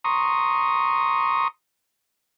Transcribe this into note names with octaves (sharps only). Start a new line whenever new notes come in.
A#5 C6 C#6 D#6